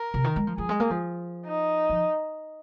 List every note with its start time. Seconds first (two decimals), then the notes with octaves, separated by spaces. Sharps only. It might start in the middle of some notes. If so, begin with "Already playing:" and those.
Already playing: A#4
0.14 C3
0.24 D#3
0.36 G#3
0.47 F3
0.58 F3 G#4
0.69 G#3
0.80 A#3
0.90 F3
1.46 D#4
1.90 F3